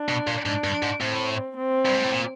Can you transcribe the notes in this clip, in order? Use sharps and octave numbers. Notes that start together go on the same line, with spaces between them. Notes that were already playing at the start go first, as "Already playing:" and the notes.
Already playing: D4
B2
A#2
G#2 D4
G2
G#2
A2 C4
C4
G2
G#2
A2
A#2